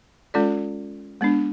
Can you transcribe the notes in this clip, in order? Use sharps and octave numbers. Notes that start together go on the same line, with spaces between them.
G#3 C#4 F4 A4 D5
G#3 B3 D4